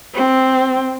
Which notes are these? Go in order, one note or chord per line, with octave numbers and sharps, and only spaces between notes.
C4